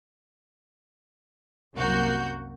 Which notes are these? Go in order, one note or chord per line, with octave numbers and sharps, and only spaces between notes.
C2 F#2 A#3 F#4 G6